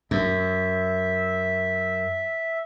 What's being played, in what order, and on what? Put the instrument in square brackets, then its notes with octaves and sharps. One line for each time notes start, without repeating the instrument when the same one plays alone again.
[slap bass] F#2 [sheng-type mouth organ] E5